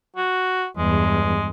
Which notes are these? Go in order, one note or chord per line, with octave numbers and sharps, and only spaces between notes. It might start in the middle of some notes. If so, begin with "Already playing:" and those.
F#4
E2 G2 G#3